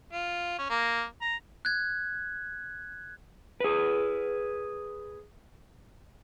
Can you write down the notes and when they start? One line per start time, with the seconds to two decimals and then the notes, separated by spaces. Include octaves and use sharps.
0.12 F4
0.58 C#4
0.70 A#3
1.22 A#5
1.65 F#6 G#6
3.60 G#4 B4